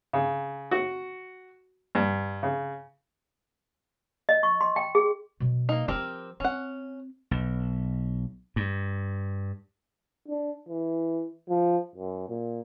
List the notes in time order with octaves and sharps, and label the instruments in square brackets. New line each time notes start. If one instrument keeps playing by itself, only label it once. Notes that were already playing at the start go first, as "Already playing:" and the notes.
[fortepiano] C#3
F#4
G2
C#3
[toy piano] D#5
C#6
C6
G5
G#4
[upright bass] B2 F#3
[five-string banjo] A#3 D#4
[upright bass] F3 F4 [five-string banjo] C4 G4 A#4
[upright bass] C4 [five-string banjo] C#4 F#5
[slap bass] B1
G2
[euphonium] D4
E3
F3
F#2
A#2